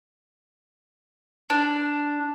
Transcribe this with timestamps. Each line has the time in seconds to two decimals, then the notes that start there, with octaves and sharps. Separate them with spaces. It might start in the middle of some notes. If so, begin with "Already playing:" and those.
1.50 D4